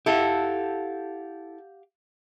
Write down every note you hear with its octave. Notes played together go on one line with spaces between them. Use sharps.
E4 G4 A4 F5 F#5